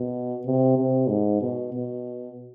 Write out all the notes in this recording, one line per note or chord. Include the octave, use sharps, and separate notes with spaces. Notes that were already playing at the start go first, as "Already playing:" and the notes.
Already playing: B2
C3
C3
G#2
B2
B2